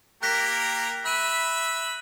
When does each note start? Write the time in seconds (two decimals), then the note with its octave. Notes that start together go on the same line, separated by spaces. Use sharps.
0.23 A#3 G4 A#4 F#6 A#6 B6
1.06 E5 B5 F#6 D#7